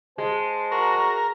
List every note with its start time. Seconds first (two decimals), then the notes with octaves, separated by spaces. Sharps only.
0.18 G#3 C5 A5
0.72 F#4 A#4